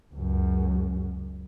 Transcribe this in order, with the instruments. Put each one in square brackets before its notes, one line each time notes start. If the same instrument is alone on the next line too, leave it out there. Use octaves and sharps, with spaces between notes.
[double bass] C#2 F#2